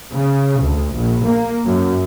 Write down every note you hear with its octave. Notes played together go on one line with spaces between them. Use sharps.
C#3
D2
A#1
A#3
F#2